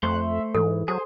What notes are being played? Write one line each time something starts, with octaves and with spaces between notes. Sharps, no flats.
F2 A3 C5 F#6
E5
G#2 E3 A4
F#3 G#4 C5